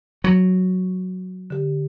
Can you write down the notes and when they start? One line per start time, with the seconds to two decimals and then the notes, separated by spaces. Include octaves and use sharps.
0.24 F#3
1.50 D3 G4